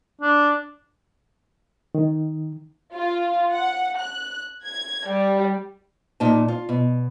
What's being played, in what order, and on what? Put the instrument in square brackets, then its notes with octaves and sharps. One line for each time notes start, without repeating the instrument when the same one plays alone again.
[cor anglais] D4
[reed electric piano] D#3
[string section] F4
F#5
F#6
G#6
G3
[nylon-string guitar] A#2 D#4 A5
F4
B2